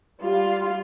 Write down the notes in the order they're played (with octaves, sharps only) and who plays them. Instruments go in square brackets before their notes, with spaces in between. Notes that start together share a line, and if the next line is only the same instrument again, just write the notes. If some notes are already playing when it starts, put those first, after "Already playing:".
[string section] G3 F4